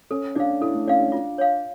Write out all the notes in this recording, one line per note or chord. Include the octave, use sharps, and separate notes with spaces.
C#4 A4
D4 D5 F5
E4 A4
A3
C#4 D5 F5
D4
F4
C#5 F5